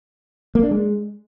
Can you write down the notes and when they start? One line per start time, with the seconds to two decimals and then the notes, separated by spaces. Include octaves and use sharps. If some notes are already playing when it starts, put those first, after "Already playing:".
0.55 A#3
0.63 D4
0.71 G#3